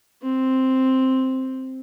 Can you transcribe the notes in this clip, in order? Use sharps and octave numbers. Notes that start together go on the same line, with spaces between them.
C4